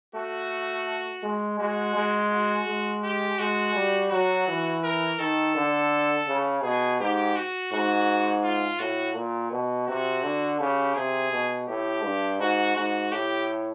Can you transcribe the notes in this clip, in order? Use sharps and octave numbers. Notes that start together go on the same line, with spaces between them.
A3 F#4
G#3
G#3 F#4
G#3
F#4
G#3
G4
G#3 F#4
G3
F#3 F#4
E3
A#4
D#3 A4
D3
C#3
B2 G#4
G#2 G4
F#4
G#2 F#4
F4
A2 F#4
A#2
B2
C3 F#4
D3
C#3 G4
C3 G#4
B2
A2 G4
G2
G#2 F#4
G#2 F#4
A2 G4